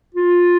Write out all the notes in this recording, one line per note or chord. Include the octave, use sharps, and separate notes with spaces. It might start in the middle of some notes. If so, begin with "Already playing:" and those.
F4